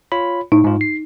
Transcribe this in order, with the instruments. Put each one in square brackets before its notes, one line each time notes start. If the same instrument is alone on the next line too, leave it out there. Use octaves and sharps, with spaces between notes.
[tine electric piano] F4 C#5 B5
[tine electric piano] A2 [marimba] D#4
[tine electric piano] G#2 F4
C7